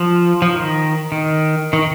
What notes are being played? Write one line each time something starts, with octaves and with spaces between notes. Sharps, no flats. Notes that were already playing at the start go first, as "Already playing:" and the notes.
Already playing: F3
F3
D#3
D#3
D#3